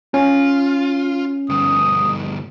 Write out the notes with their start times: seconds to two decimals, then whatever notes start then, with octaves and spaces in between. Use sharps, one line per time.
0.14 C#4 F4
1.49 D2 G2 D#6